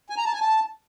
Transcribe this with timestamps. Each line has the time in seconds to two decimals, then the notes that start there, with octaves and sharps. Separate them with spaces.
0.10 G#5
0.18 A#5
0.25 A5
0.33 G#5
0.41 A5